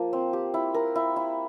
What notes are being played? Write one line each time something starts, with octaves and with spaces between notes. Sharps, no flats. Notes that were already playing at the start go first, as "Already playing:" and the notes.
Already playing: F3 A#3
C4
G4
E4
A#4
E4
E4